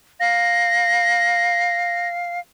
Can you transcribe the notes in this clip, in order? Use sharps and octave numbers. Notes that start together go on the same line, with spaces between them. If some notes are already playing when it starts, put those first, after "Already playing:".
F5 A#6